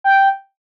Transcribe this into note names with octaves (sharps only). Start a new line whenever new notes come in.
G5